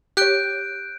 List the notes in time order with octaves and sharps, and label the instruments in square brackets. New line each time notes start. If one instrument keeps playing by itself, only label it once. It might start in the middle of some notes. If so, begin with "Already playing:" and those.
[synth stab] G4 C#5 [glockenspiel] F#6 G6 D7